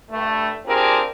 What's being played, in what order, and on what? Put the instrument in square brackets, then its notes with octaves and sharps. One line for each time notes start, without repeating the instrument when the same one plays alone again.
[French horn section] G2 A3
C4 D4 F4 G4 G#4 A#4